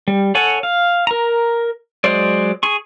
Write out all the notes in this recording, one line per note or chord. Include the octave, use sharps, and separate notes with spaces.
G3
A4 C#5 F#5 G#5
F5
A#4 A#5
F#3 G#3 C5 D5
G#4 C#6